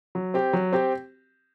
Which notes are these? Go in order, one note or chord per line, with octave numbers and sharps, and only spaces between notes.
F#3
C4 G4
F#3
C4 G4